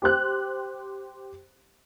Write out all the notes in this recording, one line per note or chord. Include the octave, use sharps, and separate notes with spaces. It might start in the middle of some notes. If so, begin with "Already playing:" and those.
G4 C5 F#6